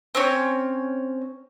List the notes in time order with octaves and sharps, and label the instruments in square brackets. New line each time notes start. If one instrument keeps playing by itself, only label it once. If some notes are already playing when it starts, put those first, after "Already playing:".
[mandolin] C4 C#4 C#5